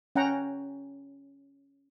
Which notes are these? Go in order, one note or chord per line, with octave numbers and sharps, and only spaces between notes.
C#4 F#5 G5 A#5